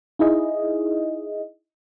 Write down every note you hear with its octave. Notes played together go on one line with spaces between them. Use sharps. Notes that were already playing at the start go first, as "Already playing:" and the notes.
D#4 E4 G#4 D#5